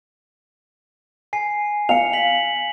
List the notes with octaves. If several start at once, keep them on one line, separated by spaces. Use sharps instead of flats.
G#5 C7
F5 C#7 F7
B6 F#7